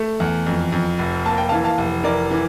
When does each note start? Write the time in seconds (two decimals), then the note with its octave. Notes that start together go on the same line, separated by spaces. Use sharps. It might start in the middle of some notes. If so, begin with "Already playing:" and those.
Already playing: A3
0.20 E2
0.46 F2
0.72 F2
0.99 F1
1.25 A#3 A5
1.38 G5
1.49 E3 F5 A5
1.64 F5 A5
1.78 F1
2.04 E3 A#4 D5
2.31 E3